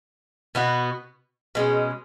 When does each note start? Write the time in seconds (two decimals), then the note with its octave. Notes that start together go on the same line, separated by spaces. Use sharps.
0.55 B2 B3 F#4
1.55 B2 G#3 C#4